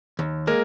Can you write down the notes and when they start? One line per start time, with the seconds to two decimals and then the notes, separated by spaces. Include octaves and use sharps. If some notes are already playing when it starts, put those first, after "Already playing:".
0.19 D#2
0.47 G#3 A#3 A#4